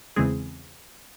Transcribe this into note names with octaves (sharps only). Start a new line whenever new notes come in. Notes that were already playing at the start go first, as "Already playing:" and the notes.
E2 C#3 E3 G#3 C4 G#4